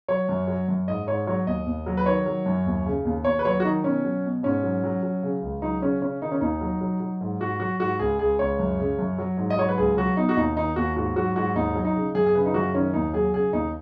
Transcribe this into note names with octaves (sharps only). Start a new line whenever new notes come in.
F#3 C#5
F#2
F#3
F#2
G#2 D#5
G#2 C#5
F#3 C#5
D#2 D#5
D#2
F#3
B4
D#3 C#5
F#3
F#2
D#2
C#3
D#2
D#2 C#5
B4
F#3 C#5
F#4
D#3 D#4
B2 C#4
F#3
B2
G#2 C#4
F#3
F#3
F#3
C#3
C#2
F#3 D#4
C#3 C#4
C#3 C#4
D#3 D#4
C#4
D#2 D#4
F#3
F#3
F#3
G#2
G#2 F#4
F#3 F#4
G#2 F#4
C#2 G#4
C#2 G#4
C#2 C#5
F#2
C#3
F#2
F#3
G#2
D#5
F#3 C#5
B4
C#2 G#4
F#3 F#4
B2 D#4
F#4
D#2 D#4
D#3 D#4
D#2 F#4
G#2 F#4
F#3 F#4
G#2 F#4
D#2 D#4
F#3
D#4
C#3
F#2 G#4
G#4
C#3 B4
D#4
F#2 F#4
D#3 C#4
D#2 D#4
F#3 G#4
C#3 G#4
D#2 D#4